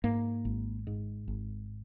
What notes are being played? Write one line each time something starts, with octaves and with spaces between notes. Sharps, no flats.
G#2 A#3
G#1
G#2
G#1